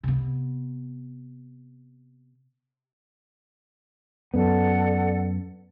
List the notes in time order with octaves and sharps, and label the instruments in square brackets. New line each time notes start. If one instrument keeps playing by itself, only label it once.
[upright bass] C3 B3
[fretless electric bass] F#2 B3 [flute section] A4 D5 F#5